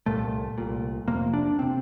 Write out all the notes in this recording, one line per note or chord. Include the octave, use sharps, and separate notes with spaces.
C2 A#2 A3
C2 A#2
F1 F2 C3 A#3
D4
C3 C4